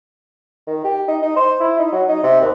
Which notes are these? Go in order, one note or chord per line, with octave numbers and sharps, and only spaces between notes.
D#3
G4
D#4
D#4
C5
E4
D#4
F#3
D#4
C3
D#2